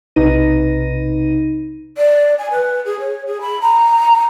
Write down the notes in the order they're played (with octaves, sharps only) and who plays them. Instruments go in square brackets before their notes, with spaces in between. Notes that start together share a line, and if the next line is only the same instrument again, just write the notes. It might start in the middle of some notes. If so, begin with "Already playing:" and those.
[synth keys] B1 C3 D#4 B4 A#6 D#7
[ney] D5
G#5
B4
G#4
C#5
G#4
B5
A#5